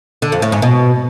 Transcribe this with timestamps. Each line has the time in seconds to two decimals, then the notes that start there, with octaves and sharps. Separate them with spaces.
0.22 D3
0.32 F2
0.42 A2
0.52 G#2
0.62 B2